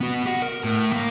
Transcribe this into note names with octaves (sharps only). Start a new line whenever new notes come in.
B3 F#4
G4 F#5
A#4
A2
A#3 A#4